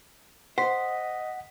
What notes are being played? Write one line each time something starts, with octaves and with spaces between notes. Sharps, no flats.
C5 D#5 F#5 B6